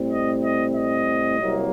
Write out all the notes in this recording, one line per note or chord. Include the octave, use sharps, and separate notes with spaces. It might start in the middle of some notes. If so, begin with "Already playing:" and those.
Already playing: A2 G3 C4
D#5
D#5
D#5
C2 C3 F#3 A#3